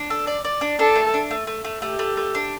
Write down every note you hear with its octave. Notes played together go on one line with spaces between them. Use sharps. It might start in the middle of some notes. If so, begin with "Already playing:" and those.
Already playing: D4
A4
D5
D5
D4
D4 A4
A3
D4
A3
A3
A3
A3 G4
A3
A3
D4